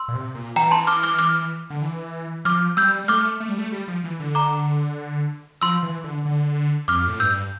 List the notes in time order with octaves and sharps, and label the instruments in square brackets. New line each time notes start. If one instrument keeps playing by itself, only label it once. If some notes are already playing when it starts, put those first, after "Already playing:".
Already playing: [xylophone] C6 E6
[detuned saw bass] A#2
C3
A#2
[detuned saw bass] E3 [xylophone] G5 A#5
[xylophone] A5 C6
D6 F6
D6 F6
D6 F6
[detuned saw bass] D3
E3
[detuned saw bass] F3 [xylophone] D6 F6
[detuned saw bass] G3 [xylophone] E6 G6
[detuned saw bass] G3
[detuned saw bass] A3 [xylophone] D6 F6
[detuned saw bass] A3
G3
A3
G3
F3
E3
D3
[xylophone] A#5 D6
[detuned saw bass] F3 [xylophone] C6 E6
[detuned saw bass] E3
D3
D3
[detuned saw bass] F2 [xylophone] D6 F6
[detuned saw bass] A2
[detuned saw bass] G2 [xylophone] E6 G6